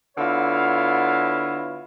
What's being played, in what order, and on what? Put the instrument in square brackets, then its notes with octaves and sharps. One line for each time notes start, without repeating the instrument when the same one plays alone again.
[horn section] D3 B3 E4 F4 C#5 F5